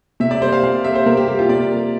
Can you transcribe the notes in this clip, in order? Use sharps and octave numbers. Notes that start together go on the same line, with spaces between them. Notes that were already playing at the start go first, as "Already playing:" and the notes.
C3 E5
D5
G3 A#3 C5
F5
C3 F5
G3 A#3 E5
C5
C3 A#4
G4
G3 A#3 G4
F4
C3 D5
G3 A#3